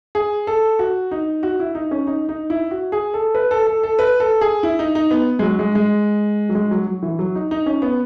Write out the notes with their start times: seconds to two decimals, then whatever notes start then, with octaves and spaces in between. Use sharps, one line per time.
0.15 G#4
0.47 A4
0.79 F#4
1.11 D#4
1.43 F#4
1.59 E4
1.75 D#4
1.91 C#4
2.07 D#4
2.29 D#4
2.50 E4
2.71 F#4
2.92 G#4
3.14 A4
3.35 B4
3.51 A4
3.67 A4
3.83 A4
3.99 B4
4.20 A4
4.41 G#4
4.63 E4
4.79 D#4
4.95 D#4
5.11 B3
5.39 G#3
5.42 F#3
5.59 G#3
5.75 G#3
6.49 F#3
6.55 G#3
6.71 F#3
6.87 F#3
7.03 E3
7.19 F#3
7.35 D#4
7.51 D#4
7.66 C#4
7.82 B3